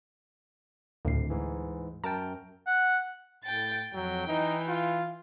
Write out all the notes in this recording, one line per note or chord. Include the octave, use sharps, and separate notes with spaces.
G#1 D2 A2 C7
G#2 E3
F#2 A#4 G5 A5
F#5
A2 G5 A6
F2 F#3 G5
E3 D#4
F4